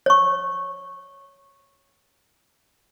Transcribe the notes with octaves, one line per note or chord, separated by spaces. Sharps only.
C#5 C#6